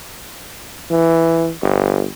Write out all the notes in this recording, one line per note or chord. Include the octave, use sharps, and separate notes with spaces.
E3
G1